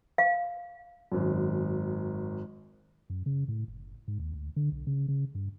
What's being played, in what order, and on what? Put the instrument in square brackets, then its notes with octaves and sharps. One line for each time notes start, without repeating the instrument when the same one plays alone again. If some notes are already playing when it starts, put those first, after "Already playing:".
[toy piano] F5
[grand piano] G#1 F#2
[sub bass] F#2
C#3
A2
F#1
G#2
D#2
D2
D3
B1
C#3
C#3
G2